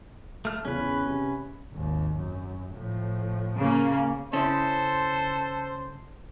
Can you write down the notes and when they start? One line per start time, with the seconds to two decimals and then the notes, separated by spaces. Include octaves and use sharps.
0.45 A3 F6
0.65 E2 C#3 E3 C#4 B4
1.07 C3
1.73 G#1 D#2
2.17 F#2
2.75 A2 F3
3.57 C#3 A#3
4.33 C#3 C#4 E4 A4 C5